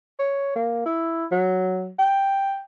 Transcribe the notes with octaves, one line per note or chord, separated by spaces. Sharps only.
C#5
A#3
E4
F#3
G5